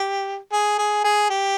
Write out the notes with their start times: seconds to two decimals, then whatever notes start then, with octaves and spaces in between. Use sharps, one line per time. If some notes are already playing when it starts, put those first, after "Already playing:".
Already playing: G4
0.52 G#4
0.79 G#4
1.04 G#4
1.30 G4